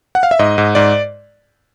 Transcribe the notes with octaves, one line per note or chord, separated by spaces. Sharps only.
F#5
F5
E5
G#2 D#5
G#2
G#2 D5